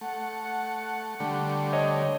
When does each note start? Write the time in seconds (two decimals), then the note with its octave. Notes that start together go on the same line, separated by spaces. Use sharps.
0.01 A3 F#5
1.20 D3 G3 A3
1.73 C#5 D#5